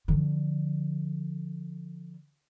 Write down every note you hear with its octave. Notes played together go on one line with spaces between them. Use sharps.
D3 F3